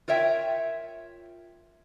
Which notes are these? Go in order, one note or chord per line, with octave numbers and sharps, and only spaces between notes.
F4 A#4 C#5 E5 G5